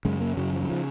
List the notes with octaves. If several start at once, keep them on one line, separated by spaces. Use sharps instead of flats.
F#2 C#3 G#3
A#3
F#2 C#3 F#3
F3
F#3
C#3 F3